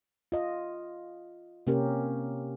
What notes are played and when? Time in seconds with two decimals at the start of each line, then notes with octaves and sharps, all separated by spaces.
0.32 F4 D#5
1.67 C3 A#3 C#4 G4 A#4